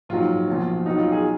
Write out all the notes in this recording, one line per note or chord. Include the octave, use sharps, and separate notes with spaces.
A#1 G#2 F#3 F4
B1 A#2 F3
C#2 B2 F#3 D#4
F4
G#4